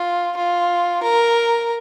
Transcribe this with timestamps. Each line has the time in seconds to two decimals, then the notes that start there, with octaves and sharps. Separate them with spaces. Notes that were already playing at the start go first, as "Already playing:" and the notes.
Already playing: F4
0.37 F4
1.03 A#4